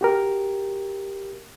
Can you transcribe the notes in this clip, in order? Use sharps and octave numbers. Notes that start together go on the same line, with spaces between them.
F#4 G4 A#4